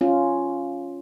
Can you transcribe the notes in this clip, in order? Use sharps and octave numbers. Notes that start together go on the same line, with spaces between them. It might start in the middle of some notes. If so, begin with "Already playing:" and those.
C#4 F4